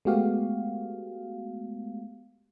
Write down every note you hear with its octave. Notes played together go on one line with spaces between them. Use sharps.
G#3 A3 B3 F#4 G4 F5